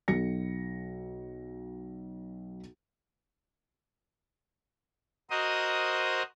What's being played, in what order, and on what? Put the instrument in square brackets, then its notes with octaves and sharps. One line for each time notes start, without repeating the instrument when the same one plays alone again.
[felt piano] B1 F#4 A#6 C#7
[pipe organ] F#4 A#4 C5 D#5 D#6